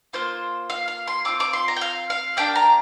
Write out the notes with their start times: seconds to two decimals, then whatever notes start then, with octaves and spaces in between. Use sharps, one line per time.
0.13 A#3 F4 C5
0.70 F5
0.88 F5
1.07 C6
1.25 C4 F4 D6
1.40 D6
1.53 C6
1.68 A#5
1.76 G5
1.81 F5
2.10 F5
2.37 A#3 D4 G4 G5
2.56 A#5